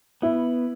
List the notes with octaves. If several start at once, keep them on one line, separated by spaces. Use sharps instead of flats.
B3 E4